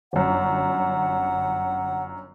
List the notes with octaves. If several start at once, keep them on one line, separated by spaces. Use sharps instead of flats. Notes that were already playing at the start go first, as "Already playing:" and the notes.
G1 F#2 F#5